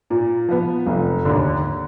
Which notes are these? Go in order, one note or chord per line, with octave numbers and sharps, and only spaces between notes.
A#2
F3 B3
F1
D#2 D3